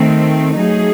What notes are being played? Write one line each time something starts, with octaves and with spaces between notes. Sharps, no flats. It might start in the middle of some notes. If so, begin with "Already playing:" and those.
Already playing: D#3 A3 C4
F#3 A3 D#4 G#4